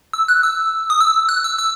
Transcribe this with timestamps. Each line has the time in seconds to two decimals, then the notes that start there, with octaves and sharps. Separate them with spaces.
0.13 E6
0.28 F#6
0.43 E6
0.90 D#6
1.01 E6
1.29 F#6
1.44 E6
1.58 E6